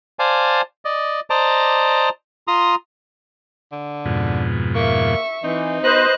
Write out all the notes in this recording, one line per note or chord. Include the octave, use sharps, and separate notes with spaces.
C5 D5 F5 G#5 A5
D5 D#5
C5 D5 D#5 A5 A#5 D6
F4 A#5 C6 D#6
D3
F2 G#2 B2
A#3 E5 C#6
E3 C4 D#4
B3 F#4 B4 C5 D#5 F#6